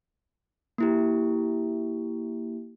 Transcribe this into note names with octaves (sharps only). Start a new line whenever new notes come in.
A#3 E4 G4